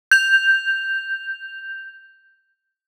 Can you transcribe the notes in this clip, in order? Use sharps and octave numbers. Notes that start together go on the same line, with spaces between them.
G6 F7